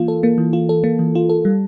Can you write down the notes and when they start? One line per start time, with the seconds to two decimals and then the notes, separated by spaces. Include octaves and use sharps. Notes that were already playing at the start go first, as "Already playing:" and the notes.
Already playing: E3 A#3 F4
0.08 A4
0.23 A#3
0.38 E3
0.53 F4
0.69 A4
0.84 A#3
0.99 E3
1.15 F4
1.29 A4
1.45 G3